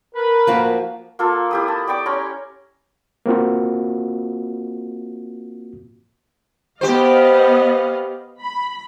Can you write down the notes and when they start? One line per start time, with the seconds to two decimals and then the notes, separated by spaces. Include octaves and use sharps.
0.14 A#4 B4
0.47 F3 A#3 F#4
1.19 A#3 F4 A4
1.51 E4 G4 D#6
1.68 A5
1.87 D5 G5 C#6 D6
2.06 C#4 A#5 C6
3.26 A#3 C4 F4 F#4
6.81 B3 G4 C5 D#5 F5
8.41 B5